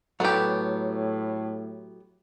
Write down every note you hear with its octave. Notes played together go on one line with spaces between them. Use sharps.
A2 F#3 A3 B3 G4